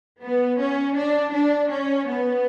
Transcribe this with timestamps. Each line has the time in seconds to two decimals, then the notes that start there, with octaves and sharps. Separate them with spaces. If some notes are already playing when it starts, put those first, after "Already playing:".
0.22 B3
0.59 C#4
0.96 D4
1.33 D4
1.70 C#4
2.07 B3